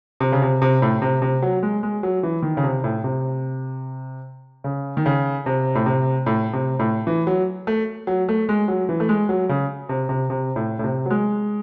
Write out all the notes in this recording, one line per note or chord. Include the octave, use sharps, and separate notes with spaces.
C3
C#3
C3
C3
A2
C3
C3
F#3
G#3
G#3
F#3
E3
D#3
C#3
C3
A2
C3
C#3
D#3
C#3
C3
A2
C3
A2
C3
A2
E3
F#3
A3
F#3
A3
G#3
F#3
E3
A3
G#3
F#3
C#3
C3
C3
C3
A2
A2
C3
F#3
G#3